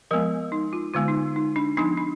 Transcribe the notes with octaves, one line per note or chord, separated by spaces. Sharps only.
F3 G#3 B3 A#4
D#4
F4
D3 G#3 B3 F4
D#4
D#4
D4
F3 B3 D4 D#4
D4